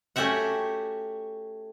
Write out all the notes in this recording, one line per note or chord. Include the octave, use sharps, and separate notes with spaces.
A3 C#4 F#4 G4 E5 F#5